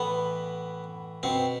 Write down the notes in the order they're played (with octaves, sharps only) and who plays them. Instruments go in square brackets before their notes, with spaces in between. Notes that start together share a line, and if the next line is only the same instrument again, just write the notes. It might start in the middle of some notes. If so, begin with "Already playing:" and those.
Already playing: [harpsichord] A2 E3 B3
B2 C4